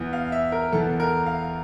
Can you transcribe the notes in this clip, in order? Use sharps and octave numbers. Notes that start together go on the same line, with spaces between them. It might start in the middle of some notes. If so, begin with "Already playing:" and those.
Already playing: E2 E3
F5
E5
A#4
E2 E3 A4
A#4
F5